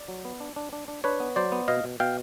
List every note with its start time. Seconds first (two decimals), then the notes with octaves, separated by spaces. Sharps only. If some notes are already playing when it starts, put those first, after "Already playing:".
Already playing: D5
0.08 F#3
0.25 B3
0.40 D4
0.56 D4
0.73 D4
0.88 D4
1.04 D4 B4 C#5
1.20 B3
1.36 F#3 C5 D5
1.52 B3
1.68 B2 D#5 F5
1.84 B2
2.00 B2 F5 G5